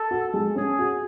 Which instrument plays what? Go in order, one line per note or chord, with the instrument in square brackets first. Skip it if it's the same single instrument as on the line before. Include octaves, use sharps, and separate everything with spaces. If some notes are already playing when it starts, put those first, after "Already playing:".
Already playing: [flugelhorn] A4
[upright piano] F#4
G#3
[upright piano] C#4 [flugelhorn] G#4
[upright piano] F#4